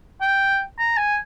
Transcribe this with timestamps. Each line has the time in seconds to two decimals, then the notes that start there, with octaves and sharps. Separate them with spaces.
0.22 G5
0.79 A#5
0.97 G#5